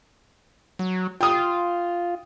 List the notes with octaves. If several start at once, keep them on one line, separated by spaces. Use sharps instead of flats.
F#3
F4 G5 D#6